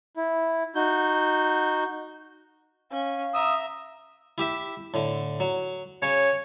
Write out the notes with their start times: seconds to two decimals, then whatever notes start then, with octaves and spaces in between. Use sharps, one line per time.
0.17 E4
0.75 D#4 F#4 G6
2.92 C#4 F5
3.34 E5 A#5 D#6 E6
4.38 E4 G4 E5
4.94 A2 D3
5.40 F#3
6.02 C#3 C#5